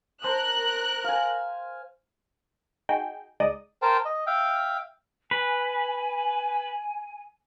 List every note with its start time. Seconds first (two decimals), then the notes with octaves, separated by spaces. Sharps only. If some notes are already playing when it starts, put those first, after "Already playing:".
0.24 A#4 C5 A5 C6 F#6
1.04 F5 G#5
2.89 D#4 F#4 G#4 G5
3.40 C#2 G#3 D#4 D5 D#5 D#6
3.82 A#4 C5 G5 A5
4.05 D#5
4.27 E5 F5 G5
5.31 B4 G#5